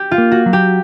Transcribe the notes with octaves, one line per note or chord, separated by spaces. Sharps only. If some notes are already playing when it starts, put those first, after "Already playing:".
Already playing: G4
F4
A#3
F#4
F#3
G4